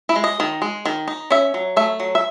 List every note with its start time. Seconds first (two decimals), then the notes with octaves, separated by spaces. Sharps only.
0.09 E4
0.16 G#3
0.24 D#5
0.40 D#3
0.62 G#3
0.86 D#3
1.08 D#4
1.31 C#4 E5
1.54 F#3
1.76 A3 E5
2.00 F#3
2.15 E5